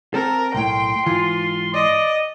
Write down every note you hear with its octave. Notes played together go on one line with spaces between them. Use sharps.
C4 A4 A#4
B1 A2 G5 C6
G#2 E3 F4
D5 D#5